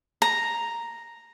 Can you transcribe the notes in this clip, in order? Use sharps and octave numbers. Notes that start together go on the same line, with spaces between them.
A#5